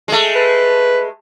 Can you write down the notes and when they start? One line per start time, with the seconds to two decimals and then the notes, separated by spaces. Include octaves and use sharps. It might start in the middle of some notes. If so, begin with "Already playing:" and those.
0.08 G#3 A3
0.35 B4